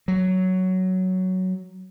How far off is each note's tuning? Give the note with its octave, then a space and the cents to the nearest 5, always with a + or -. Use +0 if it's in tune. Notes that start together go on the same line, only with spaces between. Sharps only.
F#3 +5